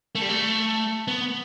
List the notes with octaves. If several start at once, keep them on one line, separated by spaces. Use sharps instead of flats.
A3
G3
A3
B3